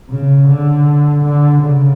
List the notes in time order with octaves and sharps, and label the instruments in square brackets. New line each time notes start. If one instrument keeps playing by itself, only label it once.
[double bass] C#3
D3
D3
C#3